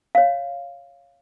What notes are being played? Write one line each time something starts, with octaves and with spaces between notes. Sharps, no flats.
C#5 F5